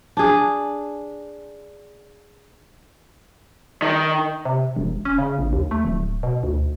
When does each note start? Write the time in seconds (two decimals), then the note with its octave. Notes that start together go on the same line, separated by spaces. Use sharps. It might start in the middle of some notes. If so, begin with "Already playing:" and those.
0.17 D4 G#4
3.82 D#3
4.45 C3
4.76 E1
5.05 C#4
5.18 C#3
5.39 A#1
5.53 D#2
5.71 A3
5.85 D1
6.23 B2
6.43 D2